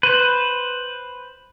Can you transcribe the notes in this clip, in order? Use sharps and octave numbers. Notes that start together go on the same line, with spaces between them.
B4 C5